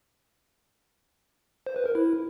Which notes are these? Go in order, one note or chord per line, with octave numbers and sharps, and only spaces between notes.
C5
B4
A#4
E4